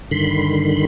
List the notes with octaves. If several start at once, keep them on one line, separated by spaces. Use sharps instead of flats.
G2 D3 D#3 B5 C6